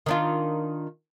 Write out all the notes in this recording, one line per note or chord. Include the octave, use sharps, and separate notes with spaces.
D#3 D4 F4